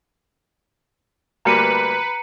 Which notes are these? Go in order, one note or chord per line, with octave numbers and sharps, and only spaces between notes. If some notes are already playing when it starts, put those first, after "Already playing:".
D2 G3 A#3 B4 A#5 C#7 D#7